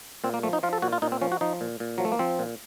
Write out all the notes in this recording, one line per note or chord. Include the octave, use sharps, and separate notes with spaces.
A#2 C4
A#3
F3 A3
D#4
F3 F4
A4
A#2 F#4
F4
A#2 D#4
C4
F3 C#4
F#4
F3 D#4
A#2
A#2
F3 F#3
A3
A#3
F3 C4
A#2